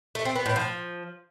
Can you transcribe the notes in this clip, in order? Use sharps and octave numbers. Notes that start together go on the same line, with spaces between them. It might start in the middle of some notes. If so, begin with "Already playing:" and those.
A3
C4
B3
A2
F3